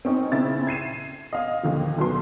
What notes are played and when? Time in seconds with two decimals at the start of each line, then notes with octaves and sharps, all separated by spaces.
0.05 C4 C#4 D#4
0.32 C#3 C4 E4 E6 A6
0.67 G#6 C7 D#7 E7
1.33 D#5 F5
1.63 D#2 D3 F3
1.98 B1 B3 C6